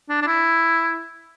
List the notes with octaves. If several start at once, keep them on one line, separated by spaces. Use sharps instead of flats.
D4
D4
E4